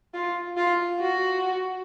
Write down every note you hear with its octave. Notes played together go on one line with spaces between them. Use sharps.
F4
F4
F#4